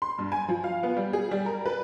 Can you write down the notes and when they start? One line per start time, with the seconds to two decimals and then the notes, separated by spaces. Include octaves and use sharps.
0.02 C6
0.18 G2
0.32 G#5
0.48 F3
0.64 F5
0.83 B3
0.97 G3
1.13 G#4
1.31 G3
1.46 A#4
1.66 B4